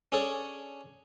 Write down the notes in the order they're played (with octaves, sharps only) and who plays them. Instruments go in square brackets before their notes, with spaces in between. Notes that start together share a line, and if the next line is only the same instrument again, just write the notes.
[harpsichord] C#4 D4 G#4 A4 C#5 D5